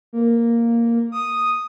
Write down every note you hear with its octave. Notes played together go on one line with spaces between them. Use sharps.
A#3
D#6